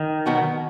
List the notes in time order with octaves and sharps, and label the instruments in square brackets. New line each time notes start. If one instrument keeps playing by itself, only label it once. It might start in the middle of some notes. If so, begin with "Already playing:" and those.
Already playing: [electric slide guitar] D#3
[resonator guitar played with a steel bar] B2 F#3 B3 F#4